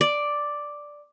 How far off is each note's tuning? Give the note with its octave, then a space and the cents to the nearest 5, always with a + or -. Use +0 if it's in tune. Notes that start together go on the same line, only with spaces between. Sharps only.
D5 +0